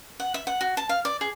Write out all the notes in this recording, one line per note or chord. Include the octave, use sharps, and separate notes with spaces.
F#5
E5
F#5
F#4
A5
F5
D5
G#4